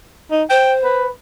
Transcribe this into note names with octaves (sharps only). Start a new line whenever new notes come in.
D#4
C5 G5
B4